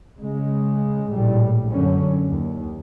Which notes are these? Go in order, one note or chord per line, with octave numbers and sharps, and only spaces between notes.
C#3 G#3
A#1 A2 G3
F#2 D3 C#4
D#2